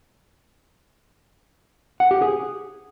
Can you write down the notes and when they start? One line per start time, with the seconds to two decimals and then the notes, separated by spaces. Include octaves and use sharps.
2.00 F#5
2.11 G4
2.22 G#4